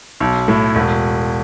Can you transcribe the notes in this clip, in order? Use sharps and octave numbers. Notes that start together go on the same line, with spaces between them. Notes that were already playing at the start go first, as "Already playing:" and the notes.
B1
A2
E1